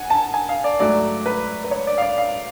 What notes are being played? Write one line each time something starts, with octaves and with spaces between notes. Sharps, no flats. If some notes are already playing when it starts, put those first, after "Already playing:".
Already playing: F#5 G#5
A5
G#5
F5
D5
G#2 F#3 A3 D5
B4
B4
C#5
D5
F5
D5
F5